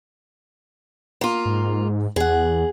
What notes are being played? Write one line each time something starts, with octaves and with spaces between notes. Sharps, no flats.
A#3 F4
G#2
E2 G#4 F#5